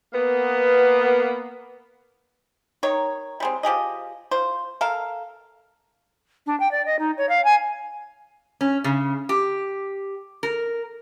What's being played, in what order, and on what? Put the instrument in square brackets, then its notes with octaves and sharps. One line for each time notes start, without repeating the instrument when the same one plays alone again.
[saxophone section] A#3 B3
[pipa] D#3 D#4 C#5
G3 G#3 C4
F3 G4 G#4 D#5
F4 C5
A4 A#4 F5
[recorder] D4
G5
D5
D#5
D#4
C#5
F5
G#5
[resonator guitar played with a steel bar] C#4
C#3
G4
A#4